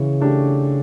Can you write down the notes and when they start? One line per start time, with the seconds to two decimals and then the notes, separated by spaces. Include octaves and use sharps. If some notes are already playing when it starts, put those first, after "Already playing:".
Already playing: C#3 E3
0.20 A3 D4 G4